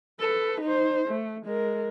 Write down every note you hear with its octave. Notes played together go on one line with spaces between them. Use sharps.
A4 B4
D#4 C5
A3
G#3 A#4